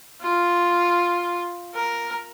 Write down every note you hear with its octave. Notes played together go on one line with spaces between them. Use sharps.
F4
A#4